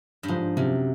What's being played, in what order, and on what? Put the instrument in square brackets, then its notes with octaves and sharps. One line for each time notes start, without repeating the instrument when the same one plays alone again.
[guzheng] G2
[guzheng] G#2 [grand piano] F3
[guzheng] F#2 [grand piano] C3